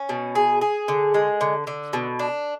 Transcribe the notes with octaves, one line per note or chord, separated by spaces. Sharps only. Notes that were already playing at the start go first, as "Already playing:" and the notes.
Already playing: C#4
B2
G#4
G#4
D3
G#3
D3
D3
B2
D4